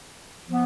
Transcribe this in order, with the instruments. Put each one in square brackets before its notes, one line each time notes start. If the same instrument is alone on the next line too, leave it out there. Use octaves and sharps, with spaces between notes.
[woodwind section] F3 B3